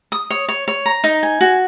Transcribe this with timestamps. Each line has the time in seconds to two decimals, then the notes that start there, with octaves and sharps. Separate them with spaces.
0.12 D#6
0.30 C#5
0.48 C#5
0.68 C#5
0.86 A#5
1.04 D#4
1.23 G#5
1.41 F#4